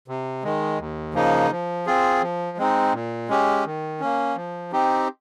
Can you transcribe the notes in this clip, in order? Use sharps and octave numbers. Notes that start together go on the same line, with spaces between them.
C3
D#3 G#3
D#2
C#3 F3 A#3 D#4
F3
C4 F4 G#4
F3
G#3 C4 D#4
A#2
G#3 C#4 G4
D#3
A#3 C#4
F3
C4 D#4 G4